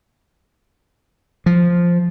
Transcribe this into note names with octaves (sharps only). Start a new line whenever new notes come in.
F3